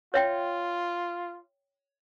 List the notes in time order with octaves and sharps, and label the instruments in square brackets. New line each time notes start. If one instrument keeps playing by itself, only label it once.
[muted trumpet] F4 [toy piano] C#5 E5 G5